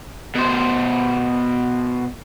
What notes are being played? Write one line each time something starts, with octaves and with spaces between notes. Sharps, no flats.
B2 C5